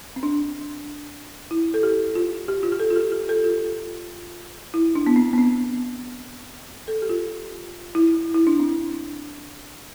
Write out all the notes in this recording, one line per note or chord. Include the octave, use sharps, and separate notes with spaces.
C4
D4
E4
A4
G4
F4
G4
F4
G4
A4
F4
G4
G4
A4
F4
E4
D4
B3
C4
B3
C4
A4
G4
F4
E4
E4
D4
C4